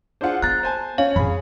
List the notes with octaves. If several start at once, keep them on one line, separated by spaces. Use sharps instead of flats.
D4 F4 G#4 C5 F#5
B3 A#5 F#6 A6
C5 G#5 A5
C#4 F5
F2 A2 G#4 B5